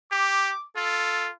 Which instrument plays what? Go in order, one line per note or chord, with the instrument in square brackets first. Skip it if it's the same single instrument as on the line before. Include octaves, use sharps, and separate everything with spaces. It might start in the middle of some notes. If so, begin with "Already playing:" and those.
[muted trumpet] G4 [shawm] D6
[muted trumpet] F4 [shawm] A4